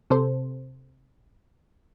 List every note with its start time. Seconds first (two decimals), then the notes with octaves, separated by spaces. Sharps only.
0.10 C3 A4 C5